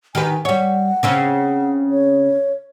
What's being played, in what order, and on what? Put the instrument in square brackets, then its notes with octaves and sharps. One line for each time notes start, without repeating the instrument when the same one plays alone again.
[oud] D#3 G4 B4 [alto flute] G#5
[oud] G3 C#5 [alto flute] F#5
[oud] C#3 C4 C#4
[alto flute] C#5